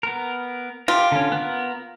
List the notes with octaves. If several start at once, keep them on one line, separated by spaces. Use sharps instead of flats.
B3 A#4
F4 G4 A#4
D3 C#4
B3 A#4